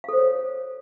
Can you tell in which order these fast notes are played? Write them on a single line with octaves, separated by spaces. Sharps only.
F5 A4 C5 C#5